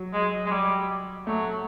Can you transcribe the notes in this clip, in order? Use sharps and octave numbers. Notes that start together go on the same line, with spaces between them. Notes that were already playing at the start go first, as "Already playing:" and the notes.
Already playing: F#3
G#3
G#3
G3
F#3 A3